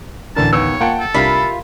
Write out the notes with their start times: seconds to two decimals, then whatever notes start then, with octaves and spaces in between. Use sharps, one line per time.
0.36 A1 D2 D3 E3 A#4 A5
0.53 D#2 B3 C#5 E6
0.81 A#3 F4 F#5 G5 A5
1.00 A4
1.14 C2 D4 F4 G4 A#4 E5 B5